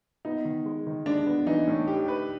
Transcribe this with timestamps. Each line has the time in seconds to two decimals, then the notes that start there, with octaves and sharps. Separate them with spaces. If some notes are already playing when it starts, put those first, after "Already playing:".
0.25 B3 D#4
0.45 D#3
0.66 G#3
0.86 D#3
1.06 G#3 D4
1.26 B3
1.46 E3 D#4
1.67 A2
1.87 G4
2.08 B4